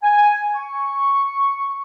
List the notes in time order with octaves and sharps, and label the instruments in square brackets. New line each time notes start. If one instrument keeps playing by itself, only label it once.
[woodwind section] G#5
C#6